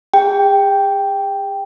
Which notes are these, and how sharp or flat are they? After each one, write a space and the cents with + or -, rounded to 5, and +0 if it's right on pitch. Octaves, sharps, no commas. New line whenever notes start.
G#4 -45 G5 +0